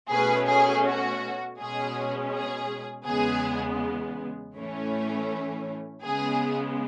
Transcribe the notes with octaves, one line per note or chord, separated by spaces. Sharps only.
B2 A3 C#4 G#4 B4
G#4
F#4
B2 G#3 C#4 G#4
G#4
E2 C#3 G#3 B3 G#4
A2 E3 A3 C#4
C#3 G#3 B3 G#4